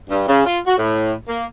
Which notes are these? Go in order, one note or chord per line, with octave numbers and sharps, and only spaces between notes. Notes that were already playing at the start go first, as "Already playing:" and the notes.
G2
C#3
F4
F#4
A2
A#3